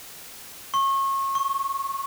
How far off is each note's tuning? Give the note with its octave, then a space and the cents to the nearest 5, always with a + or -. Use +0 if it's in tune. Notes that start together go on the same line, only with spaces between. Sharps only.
C#6 -30
C#6 +0